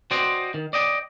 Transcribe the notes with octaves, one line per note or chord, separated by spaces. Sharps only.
F#4 C5 D5 D#5 G5
D#3
D5 D#5 G5